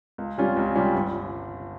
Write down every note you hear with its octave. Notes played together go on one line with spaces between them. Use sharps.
C#2
C3 G3 C#4 F4
C#2
C3 G3 C#4 F4
G1